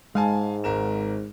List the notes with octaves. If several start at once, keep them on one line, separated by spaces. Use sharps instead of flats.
G#2 G#3 F5 G#5 A5
G#1 A#4 E7